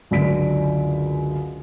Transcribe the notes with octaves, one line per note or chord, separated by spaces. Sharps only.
C#2 F#2 D3 B6 D7